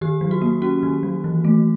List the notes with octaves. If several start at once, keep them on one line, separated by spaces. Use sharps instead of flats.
D#3 G4
F#3
F#4
A#3
C#4 F#4
D#3
F#3
E3
A3